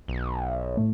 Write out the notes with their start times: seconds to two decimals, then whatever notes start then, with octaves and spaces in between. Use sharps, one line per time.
0.08 B1
0.77 A2 A3